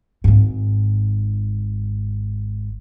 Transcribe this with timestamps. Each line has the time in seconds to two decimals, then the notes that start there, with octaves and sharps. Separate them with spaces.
0.24 G#1 G#2